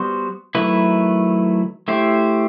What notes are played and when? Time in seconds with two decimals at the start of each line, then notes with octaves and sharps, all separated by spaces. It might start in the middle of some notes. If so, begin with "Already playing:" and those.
Already playing: G3 B3 F#4 C5
0.55 D#3 F#3 A3 E4 B4
1.88 A3 E4 G4 C5